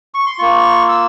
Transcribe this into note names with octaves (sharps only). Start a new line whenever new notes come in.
C#6
C6
A#3 F4 C#6
E6